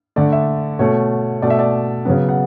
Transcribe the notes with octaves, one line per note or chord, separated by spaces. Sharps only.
D3 A3 D5
E5
B2 A3 C#5
B2 A3 D5
E5
D5
C#3 F#3 B3
F#5